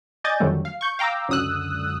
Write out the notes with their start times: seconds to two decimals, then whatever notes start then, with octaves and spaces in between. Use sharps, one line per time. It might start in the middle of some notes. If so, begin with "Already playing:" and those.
0.24 D5 D#5 G#5 G6 A6
0.40 F2 D3 D#3 F#3 G3 A3
0.65 F5
0.81 C#6 G6
0.99 F5 G5 A#5 D6 E6
1.28 C#2 F#2 D3 D#6 E6 F#6